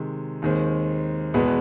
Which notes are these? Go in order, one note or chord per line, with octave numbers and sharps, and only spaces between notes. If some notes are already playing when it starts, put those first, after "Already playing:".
Already playing: C3 D#3 G#3
D#2 D#3 G#3 C4
E2 B2 G#3 B3